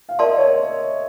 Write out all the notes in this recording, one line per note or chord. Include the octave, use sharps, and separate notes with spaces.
F5
A#4 D5 E5 F5 A5 C6
D#5
C#5